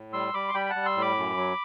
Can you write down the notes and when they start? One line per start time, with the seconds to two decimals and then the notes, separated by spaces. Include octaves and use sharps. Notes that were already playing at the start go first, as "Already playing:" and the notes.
Already playing: A2
0.13 G3 C6 E6
0.34 G3 B5 D6
0.48 C6
0.54 G3 G5 B5
0.66 B5
0.70 F#5 A5
0.75 G3
0.86 C6 E6
0.96 A2
1.01 B5 D6
1.17 F#2
1.37 F#3